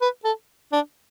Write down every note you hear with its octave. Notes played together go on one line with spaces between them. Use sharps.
B4
A4
D4